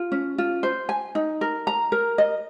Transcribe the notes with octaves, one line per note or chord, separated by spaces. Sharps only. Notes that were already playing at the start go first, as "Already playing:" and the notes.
Already playing: F4
C#4
F4
C5
G#5
D#4
A#4
A#5
A#4
D#5